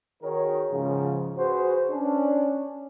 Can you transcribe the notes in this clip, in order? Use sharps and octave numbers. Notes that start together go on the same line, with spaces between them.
D#3 F#4 G#4 A#4 C#5
G#2 C#3 F3
F#4 G#4 B4 C5
C#4 D4